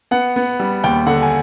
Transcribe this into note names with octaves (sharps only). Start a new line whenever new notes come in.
B3 F#5
B3
G3
D#2 G5
D3 F#5
G#5